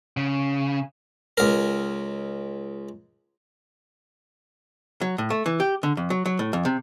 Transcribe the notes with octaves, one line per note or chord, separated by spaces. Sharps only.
C#3
C#2 A#4
F#3
A2
A3
E3
G4
D3
F2
F#3
F#3
A2
F2
C3